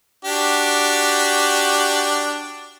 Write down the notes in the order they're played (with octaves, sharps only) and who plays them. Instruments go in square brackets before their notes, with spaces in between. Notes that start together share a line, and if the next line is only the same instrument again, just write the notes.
[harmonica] D4 F#4 G4